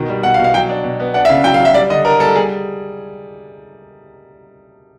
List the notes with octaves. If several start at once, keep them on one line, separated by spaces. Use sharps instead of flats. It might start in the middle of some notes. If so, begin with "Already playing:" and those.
Already playing: B2 D#3
G3
B2 F#5
F5
B2
F5
F#3 G5
D4
B2
B3
D4 F#5
E5
C#3 F5
F#3 G5
F5
F#3
E5
G3 D5
D3 D#5
D4 A#4
G3 A4
G3 G#4